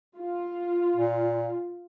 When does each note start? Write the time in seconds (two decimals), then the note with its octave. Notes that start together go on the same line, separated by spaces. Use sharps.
0.18 F4
0.96 A#2